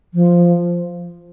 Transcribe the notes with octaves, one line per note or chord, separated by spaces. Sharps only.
F3